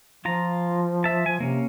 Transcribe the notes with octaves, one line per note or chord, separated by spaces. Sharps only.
F3 F4 A#5
E5 A5
F3 G#5
C3 A#3 C#4